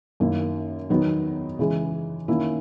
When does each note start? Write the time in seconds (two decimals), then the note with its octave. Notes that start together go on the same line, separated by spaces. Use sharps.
0.20 F#2 D#3 A#3 E4
0.90 E2 D#3 F#3 B3 D#4
1.59 C#3 E3 G#3
2.28 D#3 A#3 C#4 E4